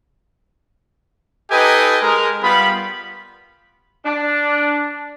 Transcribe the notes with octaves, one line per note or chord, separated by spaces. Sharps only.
D#4 G4 A4 B4 D#5 G#5
G#3 A#4
G3 B3 F4 B5
D4